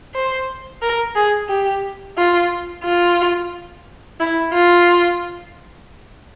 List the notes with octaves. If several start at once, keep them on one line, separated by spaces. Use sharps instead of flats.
C5
A#4
G#4
G4
F4
F4
E4
F4